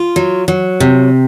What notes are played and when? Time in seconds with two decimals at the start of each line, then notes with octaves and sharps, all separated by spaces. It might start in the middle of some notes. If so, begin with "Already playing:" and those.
Already playing: F4
0.16 F#3
0.48 F#3
0.80 C3